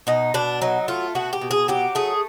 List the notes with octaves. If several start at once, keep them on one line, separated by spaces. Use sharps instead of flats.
B2 D#4
B2 D4
F#3 D#4
A3 F4
B2 F#4
G4
B2
G#4
F#3 G4
A3 G#4